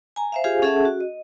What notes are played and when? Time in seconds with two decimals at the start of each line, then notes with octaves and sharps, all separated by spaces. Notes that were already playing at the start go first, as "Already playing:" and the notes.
0.16 G#5 A#5
0.32 C5 E5 F5
0.44 F4 G4 G#4 C5 F5 G#5
0.62 C#4 G#4 A4 E5 F#5 A5
0.85 F#4
1.01 D#5